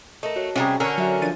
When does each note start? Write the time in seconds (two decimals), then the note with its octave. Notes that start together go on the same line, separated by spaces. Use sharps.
0.23 A3 A#4 D#5
0.36 F#4 C#5
0.56 C3 G3 C#4 F#4 G#4 C#5 G#5 A#5
0.80 D3 C#4 A#4 C#5 F#5 E6
0.98 F#3 F#4 E5 G#5
1.22 F3 D4 A6 D#7